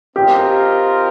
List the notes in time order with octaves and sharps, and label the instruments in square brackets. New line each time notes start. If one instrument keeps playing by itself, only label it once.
[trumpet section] C4 F4 A#4 D#5 [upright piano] G4